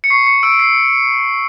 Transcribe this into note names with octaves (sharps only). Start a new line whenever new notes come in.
C#7
C#6 C7
C#7
E6 D7
C7